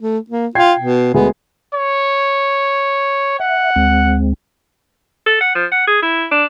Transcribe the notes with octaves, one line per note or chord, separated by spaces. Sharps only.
A3
A#3
F4 G5 G#6 C7
B2
D2 G#3 B3
C#5
E5 F#5
D2 G#3 C4
A4
F#5
F3
F#5
G#4
E4
D4